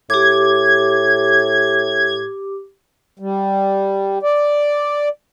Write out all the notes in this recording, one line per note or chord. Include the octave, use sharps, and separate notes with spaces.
A2 G4 D6 G#6
G3
D5